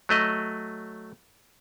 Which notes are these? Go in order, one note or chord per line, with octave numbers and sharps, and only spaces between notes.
F#3 A3 D#5